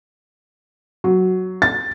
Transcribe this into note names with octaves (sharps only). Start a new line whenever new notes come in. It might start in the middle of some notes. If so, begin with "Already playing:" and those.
F#3
A6